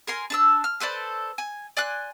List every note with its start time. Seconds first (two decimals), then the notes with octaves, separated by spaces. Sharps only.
0.07 A#4 G#5 C6
0.30 D4 A5 E6
0.64 F6
0.80 A4 B4 C5 D5
1.38 G#5
1.77 D5 G#5 C6 F#6